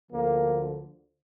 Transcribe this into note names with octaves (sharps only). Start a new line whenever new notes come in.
D2 D3 F3 A#3